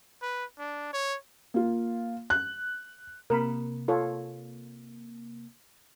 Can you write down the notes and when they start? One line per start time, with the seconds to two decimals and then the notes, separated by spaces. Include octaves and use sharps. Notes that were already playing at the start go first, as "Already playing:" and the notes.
0.22 B4
0.59 D4
0.93 C#5
1.54 A#3 F4
2.30 F#6
3.30 C3 A#3 A#4 B5
3.88 F4 A4 C#5